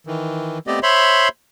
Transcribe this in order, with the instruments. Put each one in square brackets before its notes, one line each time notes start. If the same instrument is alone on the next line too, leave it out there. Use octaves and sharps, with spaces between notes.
[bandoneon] D#3 E3
A3 B3 C4 G4 D5 D#5
C5 C#5 E5 B5 C6